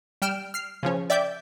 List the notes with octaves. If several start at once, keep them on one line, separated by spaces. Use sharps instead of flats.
G3 G5 F6 D7 E7
F6 C7
C#3 F3 C#4
D5 E5 G5 D6 G6